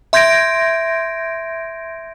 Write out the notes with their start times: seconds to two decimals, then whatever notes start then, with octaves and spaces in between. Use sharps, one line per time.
0.13 E5 C6 G6 G#6 A#6 D7